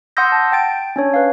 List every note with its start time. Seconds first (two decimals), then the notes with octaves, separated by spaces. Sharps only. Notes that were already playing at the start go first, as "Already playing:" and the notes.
0.17 F#5 C6 D#6 E6 G6 A#6
0.32 A5
0.52 G5 A6 D7
0.96 C#4 D4 C#5
1.14 B4 F5